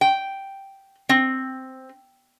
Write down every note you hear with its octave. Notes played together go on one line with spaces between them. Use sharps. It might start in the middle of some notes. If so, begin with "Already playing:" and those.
G5
C4